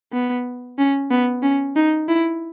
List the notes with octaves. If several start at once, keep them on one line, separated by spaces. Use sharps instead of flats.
B3
C#4
B3
C#4
D#4
E4